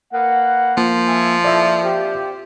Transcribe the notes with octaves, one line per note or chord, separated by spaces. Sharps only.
A#3 B4 F#5
F3 A#3
E5 G#5
A#2 E4 A4 D5 E5
C4 F4 G4